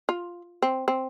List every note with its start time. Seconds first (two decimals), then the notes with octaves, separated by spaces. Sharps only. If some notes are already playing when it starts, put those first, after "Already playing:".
0.09 F4
0.62 C4
0.88 C4